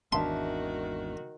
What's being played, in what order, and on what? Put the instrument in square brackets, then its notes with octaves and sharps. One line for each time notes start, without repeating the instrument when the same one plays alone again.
[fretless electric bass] G#1 E2 [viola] D#3 F#4 [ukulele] D4 E5 A5 [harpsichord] C6